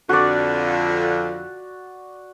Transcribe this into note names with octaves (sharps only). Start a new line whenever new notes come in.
F2 D3 F#4 D5